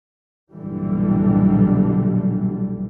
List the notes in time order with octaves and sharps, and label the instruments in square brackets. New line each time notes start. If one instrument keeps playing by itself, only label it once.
[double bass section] B1 G2 A#2 D3 E3 G3